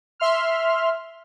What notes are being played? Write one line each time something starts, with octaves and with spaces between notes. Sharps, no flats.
E5 C6 F6